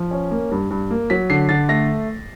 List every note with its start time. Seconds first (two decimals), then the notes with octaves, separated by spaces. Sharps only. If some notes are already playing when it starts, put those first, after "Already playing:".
Already playing: F3
0.11 C#4
0.31 A#3
0.51 G2
0.71 G2
0.91 A#3
1.10 F#3 B6
1.30 D3 C7
1.49 D3 A6
1.69 A3 A#6